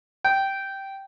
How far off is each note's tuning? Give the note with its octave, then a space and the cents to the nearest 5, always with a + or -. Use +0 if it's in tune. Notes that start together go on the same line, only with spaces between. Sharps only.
G5 -10